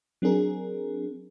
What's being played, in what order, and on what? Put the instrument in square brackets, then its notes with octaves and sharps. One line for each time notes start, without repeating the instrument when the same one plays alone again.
[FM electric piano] F#3 C4 D4 G#4 A#4